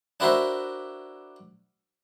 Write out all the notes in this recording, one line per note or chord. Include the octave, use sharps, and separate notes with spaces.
D4 E4 F#4 A#4 C5 E5